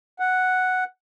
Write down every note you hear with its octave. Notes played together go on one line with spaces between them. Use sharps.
F#5